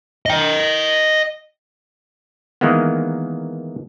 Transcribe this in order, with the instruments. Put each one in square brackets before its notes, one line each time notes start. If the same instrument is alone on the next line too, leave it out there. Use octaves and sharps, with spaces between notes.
[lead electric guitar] D#5 G5
[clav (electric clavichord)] D#3 E3 G#3 A#3 B3